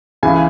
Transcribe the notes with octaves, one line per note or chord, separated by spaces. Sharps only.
C#2 C#3 E3 G#3 G#5